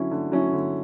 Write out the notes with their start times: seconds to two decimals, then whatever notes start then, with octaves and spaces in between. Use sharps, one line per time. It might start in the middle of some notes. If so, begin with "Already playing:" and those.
Already playing: D3 F#3 C#4 E4
0.11 D3
0.32 F#3 C#4 E4
0.53 D3